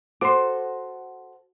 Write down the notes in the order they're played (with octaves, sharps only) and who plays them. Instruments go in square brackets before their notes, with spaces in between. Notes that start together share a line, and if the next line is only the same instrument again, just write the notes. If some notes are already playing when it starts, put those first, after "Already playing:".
[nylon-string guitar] F#4 A4 C5 [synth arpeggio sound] C6 D6